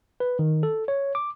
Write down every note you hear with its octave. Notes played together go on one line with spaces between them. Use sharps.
B4
D#3
A4
C#5
D6